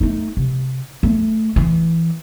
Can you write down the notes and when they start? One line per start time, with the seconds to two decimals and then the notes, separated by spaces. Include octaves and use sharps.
0.01 A3 D#4
0.37 C3
1.03 A3
1.56 E3